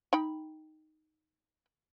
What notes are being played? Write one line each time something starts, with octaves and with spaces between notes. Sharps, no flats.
D#4 G5 B5